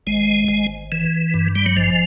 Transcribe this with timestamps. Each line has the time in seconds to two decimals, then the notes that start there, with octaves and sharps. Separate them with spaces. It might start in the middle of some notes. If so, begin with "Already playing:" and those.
0.07 G#1 G#3
0.48 G#1
0.92 E3
1.34 G2
1.55 G3
1.66 F#3
1.76 G#1 F3